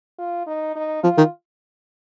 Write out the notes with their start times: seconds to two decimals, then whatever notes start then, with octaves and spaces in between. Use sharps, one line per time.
0.19 F4
0.47 D#4
0.76 D#4
1.03 F3 F4
1.18 D#3